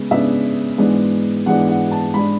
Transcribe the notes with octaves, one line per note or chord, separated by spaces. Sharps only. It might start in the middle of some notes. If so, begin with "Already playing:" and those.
Already playing: C#3 G#3 B3
C#3 G#3 B3 D4 E5
G#2 E3 G#3 B3 D4
G#2 E3 G#3 B3 D4 F#5
F#5
A5
G#2 G#3 D4 B5